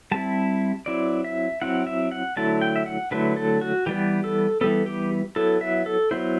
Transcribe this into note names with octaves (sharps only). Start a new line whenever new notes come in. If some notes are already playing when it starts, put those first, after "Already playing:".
G3 C4 E4 A5
F#3 C4 E4 D5
E5
F#3 C4 E4 F#5
E5
F#5
D3 F#3 A3 E4 A5
G5
E5
F#5
D3 F#3 A3 E4 B4
A4
F#4
E3 G3 B3 G4
A4
E3 G3 B3 A4
G4
F#3 B3 E4 A4
E5
A4
F#3 B3 E4 C5